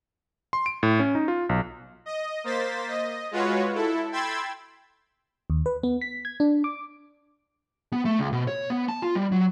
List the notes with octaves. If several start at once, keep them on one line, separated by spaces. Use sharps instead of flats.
C6
D7
A2
C#4
D#4
F4
B1
D#5
A#3 C5 A6 B6
D#5
G#3 F4 F#4 B4 C#5
E4 A4
G5 B5 C6 E6 G#6 A6
D#2
B4
B3
B6
G#6
D4
D6
B3
A3
C#2
B2
C#5
B3
A5
F4
G3
F#3